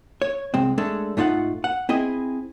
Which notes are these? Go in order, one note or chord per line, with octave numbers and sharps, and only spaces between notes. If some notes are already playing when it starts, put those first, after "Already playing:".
C#5
C2 G#3 C4
G#3 A3 D4 A4
G#2 A3 D#4 F4 F5 F#5
F#5
C4 E4 G#4 D#5